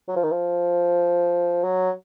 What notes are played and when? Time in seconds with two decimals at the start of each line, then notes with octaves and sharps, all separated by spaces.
0.08 F#3
0.16 F3
0.24 D#3
0.31 F3
1.63 F#3